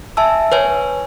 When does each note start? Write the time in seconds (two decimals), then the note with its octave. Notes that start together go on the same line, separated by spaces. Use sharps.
0.17 E5 G#5 A5 E6
0.52 B4 C#5 G#5